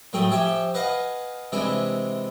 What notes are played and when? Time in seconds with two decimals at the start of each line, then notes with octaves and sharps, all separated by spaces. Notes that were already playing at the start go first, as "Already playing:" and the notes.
0.13 A2 F#3 A3 G#4 G5 G#5
0.30 F3 G4 C#5 E5 G5 G#5
0.74 B4 D#5 F5 F#5 G#5
1.52 C3 E3 G#3 D4 G#5 B5